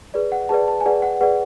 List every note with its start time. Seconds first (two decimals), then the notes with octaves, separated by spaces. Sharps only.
0.14 G#4 B4 D5
0.32 F#5
0.49 G#4 B4 D5 A5
0.68 A5
0.80 G#5
0.86 G#4 B4 D5 F#5
1.02 F#5
1.21 G#4 B4 D5 F#5